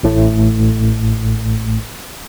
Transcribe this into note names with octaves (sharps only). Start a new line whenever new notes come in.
A1 A2 A3